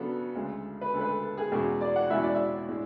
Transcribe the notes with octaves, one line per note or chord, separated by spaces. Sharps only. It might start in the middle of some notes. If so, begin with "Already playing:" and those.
Already playing: C#3 F#3 B3 D4 A4
D2 C#3 G#3
B4
D2 C#3 G#3 A4
B4
A4
A4
G#4
E2 B2 G#3 C#4 E4 G#4
D5
F#5
E2 B2 G#3 C#4 E4 E5
D5
E5
A2 G#3 D4